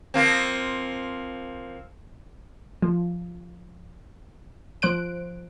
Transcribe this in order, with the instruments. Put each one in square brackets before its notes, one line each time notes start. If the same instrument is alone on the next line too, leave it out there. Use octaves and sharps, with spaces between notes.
[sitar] F3 A#3 C4
[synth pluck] F3
F3 C5 F#6 D7